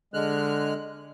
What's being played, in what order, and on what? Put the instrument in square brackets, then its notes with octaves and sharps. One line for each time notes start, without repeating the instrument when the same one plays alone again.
[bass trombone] D3 [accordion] G#3 F6 F#6